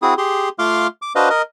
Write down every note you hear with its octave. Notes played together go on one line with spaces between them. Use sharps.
C4 E4 F#4 G#4 D#6
G4 G#4 C6
A3 F4 F5 C6 D6 F6
D6
D4 F#4 B4 C5 D#5 F5
A#4 D#5